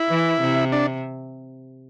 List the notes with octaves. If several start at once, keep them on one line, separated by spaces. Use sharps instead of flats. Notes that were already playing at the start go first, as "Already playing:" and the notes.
Already playing: E4
E3
C3
D4